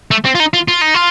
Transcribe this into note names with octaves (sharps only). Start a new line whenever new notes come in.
A3
C4
F4
D#4
F4
F4
D#4
F4